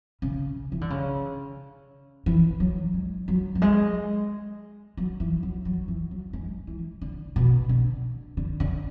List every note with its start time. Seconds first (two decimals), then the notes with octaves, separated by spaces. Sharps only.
0.22 C#3
0.72 E3
0.81 D3
0.90 C#3
2.26 E3
2.60 F#3
2.94 G#3
3.28 F#3
3.55 F#3
3.62 G#3
4.97 F#3
5.20 E3
5.43 F#3
5.65 F#3
5.88 E3
6.11 F#3
6.33 G#3
6.67 E3
7.01 D3
7.36 B2
7.69 D3
8.37 D3
8.60 D3